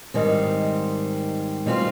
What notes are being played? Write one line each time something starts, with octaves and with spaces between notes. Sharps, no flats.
G#2 D#3 G3 C4
B2 G3 C4 F4